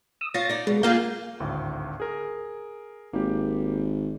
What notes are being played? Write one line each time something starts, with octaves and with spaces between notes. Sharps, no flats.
D#6 E6
F4 C#5 A6 A#6
D#4 D5
B2 G#3
A#3 F4 G#4 F5 G6
G#1 D2 A2
G#4 A#4
G#1 A#3 G4